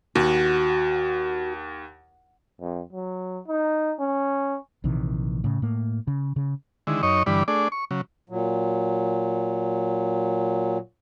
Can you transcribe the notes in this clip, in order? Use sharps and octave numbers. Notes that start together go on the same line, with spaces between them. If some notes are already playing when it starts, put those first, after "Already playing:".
D#2 F#4
F2
F#3
D#4
C#4
A#1 C3 D#3 E3
A2 C#3
A2 A#3
C#3
C#3
D3 D#3 G#3 E4
F#2 D#4 C#5 D#5 C#6
G2 D3 E3 G3 D5 B5
A3 D4 G#4 D5
C#6
C#3 F#3
A#2 F#3